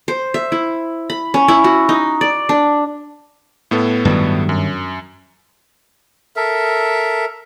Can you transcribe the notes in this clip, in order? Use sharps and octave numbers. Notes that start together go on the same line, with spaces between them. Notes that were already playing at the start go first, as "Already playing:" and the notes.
C5
E5
E4
B5
C#4
E4
F#4
D#4
D5
D4
A2 B3 A4
G2 D#3 F#3
F#2
A4 A#4 E5